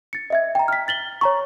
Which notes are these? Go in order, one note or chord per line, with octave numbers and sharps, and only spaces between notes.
A6 C#7
D#5 E5 G#6
G5 A#5
F6 B6
A6 F#7 G7
C#5 A#5 C#6